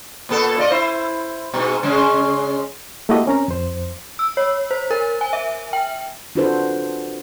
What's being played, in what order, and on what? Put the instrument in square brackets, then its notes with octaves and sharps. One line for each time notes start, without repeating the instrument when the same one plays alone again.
[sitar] A#2 B3 A4
F4 D5 D#5
E4 C5
G#2 B2
C#3 G#3 C#4
[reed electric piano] A3 A#3 E4 F#4 G4 D#5
C4 C#4 A#4 A#5
F2 C5
[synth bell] E6
C#5
C5
A#4
G#5
E5
G5
[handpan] D4 F4 F#4 A4 B4 C5